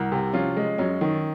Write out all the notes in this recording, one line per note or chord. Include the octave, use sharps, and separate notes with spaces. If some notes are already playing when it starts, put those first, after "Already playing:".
Already playing: C2 F#4 A#4
C3
F3 C#4 F4
G#3
F#2 C#4
D#3